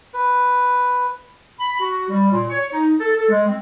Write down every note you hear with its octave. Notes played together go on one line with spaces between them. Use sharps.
B4
B5
F#4
G3
A#2
C#5
D#4
A4
A4
G#3
C4